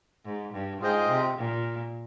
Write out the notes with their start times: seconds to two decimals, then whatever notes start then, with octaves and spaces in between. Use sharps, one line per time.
0.25 G#2
0.53 G2
0.81 G#2 F4 G#4 C5 D#5 G5
1.09 C3
1.38 A#2